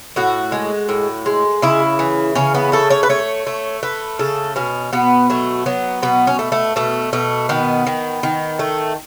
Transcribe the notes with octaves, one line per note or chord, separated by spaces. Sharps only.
A2 F#4
G#3
A2
G#3
C#3 E4
E3
C#3 C#4
B3
A3 A4
C#5
B4
A3 C#5
A3
A3 B4
C#3 A4
B2 C#4
B2 B3
F#3 A3
F#3 B3
B2 B3
C#4
A3
A3
B2 A3
B2 A3
D#3 B3
D#3
D#3
A3